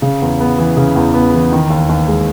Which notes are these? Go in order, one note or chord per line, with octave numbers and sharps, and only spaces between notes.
C#3
E2
B3
E3
C#3
E2
B3
E3
D#3
D#2
D#2
G#3